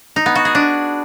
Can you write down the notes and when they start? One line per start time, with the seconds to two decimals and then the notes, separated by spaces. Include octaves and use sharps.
0.16 D#4
0.26 B3
0.35 F#4
0.45 G#4
0.55 D4